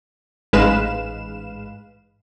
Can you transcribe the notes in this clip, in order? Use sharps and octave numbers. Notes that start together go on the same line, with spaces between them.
A1 G#2 G#3 B4 F5 E7